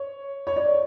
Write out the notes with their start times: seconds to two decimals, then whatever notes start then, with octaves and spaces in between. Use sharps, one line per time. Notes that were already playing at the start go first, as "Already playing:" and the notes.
Already playing: C#5
0.47 C#5
0.56 D5